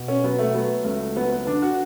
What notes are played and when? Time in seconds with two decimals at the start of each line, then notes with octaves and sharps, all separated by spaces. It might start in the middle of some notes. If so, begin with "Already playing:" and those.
Already playing: B2
0.08 C#4
0.24 F#3 B3
0.39 A3
0.54 F#3 B3
0.84 C#2 A3
1.15 F#3 B3
1.31 B3
1.46 D3 D4
1.62 F#4